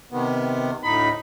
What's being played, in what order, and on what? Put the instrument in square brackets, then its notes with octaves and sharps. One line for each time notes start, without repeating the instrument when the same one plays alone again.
[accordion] C3 D#3 B3
[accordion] D2 A2 D#4 [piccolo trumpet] B5